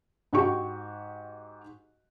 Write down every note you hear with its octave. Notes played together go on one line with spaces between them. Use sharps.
G#2 F#4 G4 C#6